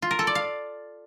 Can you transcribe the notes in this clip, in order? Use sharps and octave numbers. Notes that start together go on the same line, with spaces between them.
F4
A#4
A4
D5
F5